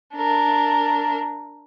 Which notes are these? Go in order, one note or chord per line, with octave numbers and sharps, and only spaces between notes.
D4 A#4